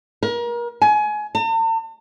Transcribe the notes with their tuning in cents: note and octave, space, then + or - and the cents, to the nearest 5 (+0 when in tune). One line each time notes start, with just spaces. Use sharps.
A#4 +30
G#5 +25
A5 +45